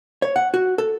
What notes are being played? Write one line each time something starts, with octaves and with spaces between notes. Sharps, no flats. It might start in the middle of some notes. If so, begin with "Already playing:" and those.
C#5
F#5
F#4
A4